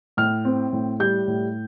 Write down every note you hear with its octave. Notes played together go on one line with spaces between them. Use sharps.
A2 F6
C4
A2
G3 G6
A2